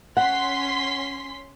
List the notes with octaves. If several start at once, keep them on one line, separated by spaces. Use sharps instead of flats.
C#4 F#5 C6 B6